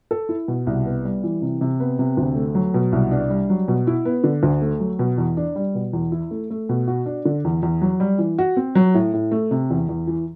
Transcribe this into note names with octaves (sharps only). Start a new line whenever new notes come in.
A4
E4
B2
C2
B3
G3
E3
C3
C3
B3
C3
D2
A3
F#3
B2
C2
D4
G3
F#3
B2
E4
B3
D3
D2
A3
F#3
B2
E2
D4
G3
B2
E2
E4
A3
A3
B2
F#4
D4
D3
E2
E2
F#3
G3
E3
F#4
C4
F#3
A2
A2
A3
C3
E2
E2
E3